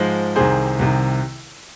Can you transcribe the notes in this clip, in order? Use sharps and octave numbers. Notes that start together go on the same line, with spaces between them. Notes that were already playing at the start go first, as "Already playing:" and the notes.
Already playing: G#2 F3 G#3
C2 C3 D#3 G#4 C5
C2 C3 D#3